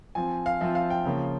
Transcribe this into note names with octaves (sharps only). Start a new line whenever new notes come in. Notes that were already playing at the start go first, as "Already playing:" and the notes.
F3 C4 F4 G#5
F5
F3 C4 F4 E5
F5
G5
C#3 F3 A#3 C#4 F4